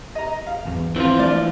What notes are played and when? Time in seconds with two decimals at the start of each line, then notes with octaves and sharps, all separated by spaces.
0.15 D#5 A#5
0.47 F5
0.65 G#1 E2
0.96 E3 F3 C4 F4
1.19 A3 D4 D5